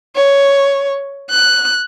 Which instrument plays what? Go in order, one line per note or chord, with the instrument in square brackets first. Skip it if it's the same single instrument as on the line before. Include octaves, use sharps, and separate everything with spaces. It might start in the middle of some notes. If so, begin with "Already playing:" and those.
[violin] C#5
F#6